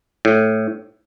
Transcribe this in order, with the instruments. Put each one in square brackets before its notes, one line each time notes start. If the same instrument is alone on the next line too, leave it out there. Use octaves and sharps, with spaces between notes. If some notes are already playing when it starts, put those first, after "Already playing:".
[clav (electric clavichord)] A2